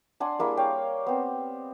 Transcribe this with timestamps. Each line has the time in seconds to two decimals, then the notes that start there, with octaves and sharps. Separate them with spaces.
0.20 D4 F#5 G#5 C6
0.39 G3 A#3 E4 G#4
0.57 C#5 F5 G5
1.06 B3 C4